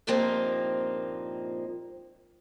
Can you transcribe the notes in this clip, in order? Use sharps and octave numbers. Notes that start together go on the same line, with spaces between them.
G2 A#2 F3 A#3 C4 D#4